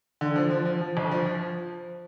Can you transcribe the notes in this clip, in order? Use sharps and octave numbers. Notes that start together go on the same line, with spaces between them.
D3
F3
F3
F3
F3
G1
F3
F3